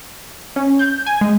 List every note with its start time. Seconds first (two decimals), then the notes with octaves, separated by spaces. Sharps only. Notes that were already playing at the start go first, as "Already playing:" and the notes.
0.56 C#4
0.79 G6
1.06 G#5
1.21 G#3